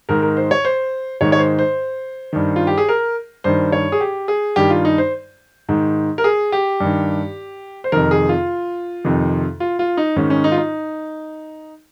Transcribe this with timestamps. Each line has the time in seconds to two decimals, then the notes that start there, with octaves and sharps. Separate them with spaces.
0.09 G#2 D#3 A#4
0.22 A#4
0.37 C5
0.51 C#5
0.65 C5
1.21 G#2 D#3 C#5
1.32 C#5
1.39 C5
1.59 C5
2.33 G2 D#3
2.56 F4
2.67 G4
2.78 G#4
2.89 A#4
3.44 G2 D#3 C5
3.72 C#5
3.92 G#4
4.01 G4
4.28 G#4
4.56 G2 D#3 G4
4.70 F4
4.85 D#4
4.98 C5
5.69 G#2 D#3
6.18 A#4
6.24 G#4
6.52 G4
6.80 G2 D#3
7.84 C5
7.92 F2 C3 D#3 A#4
8.11 G#4
8.29 F4
9.04 F2 C3 D#3
9.60 F4
9.79 F4
9.97 D#4
10.16 G#2 D#3 C#4
10.30 C#4
10.44 D#4
10.52 F4
10.58 D#4